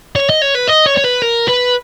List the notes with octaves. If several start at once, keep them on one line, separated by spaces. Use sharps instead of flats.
C#5
D#5
C#5
B4
D#5
C#5
C#5
B4
A#4
B4